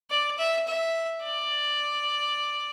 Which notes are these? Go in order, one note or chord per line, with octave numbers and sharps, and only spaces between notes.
D5
E5
E5
D5